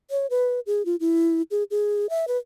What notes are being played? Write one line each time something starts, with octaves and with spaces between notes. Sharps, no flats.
C#5
B4
G#4
F4
E4
G#4
G#4
E5
B4